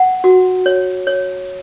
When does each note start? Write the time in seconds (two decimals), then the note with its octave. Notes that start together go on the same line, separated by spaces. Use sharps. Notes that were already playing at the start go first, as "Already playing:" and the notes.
Already playing: F#5
0.24 F#4
0.66 C#5
1.07 C#5